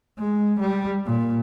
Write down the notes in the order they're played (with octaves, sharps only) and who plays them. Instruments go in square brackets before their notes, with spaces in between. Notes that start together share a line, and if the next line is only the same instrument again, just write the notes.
[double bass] G#3
G3
A#2